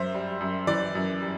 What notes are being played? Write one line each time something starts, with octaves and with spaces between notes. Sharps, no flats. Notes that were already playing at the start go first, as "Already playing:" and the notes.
Already playing: F#2 C5 E5
G3
F#2
E3 D5
F#2
G3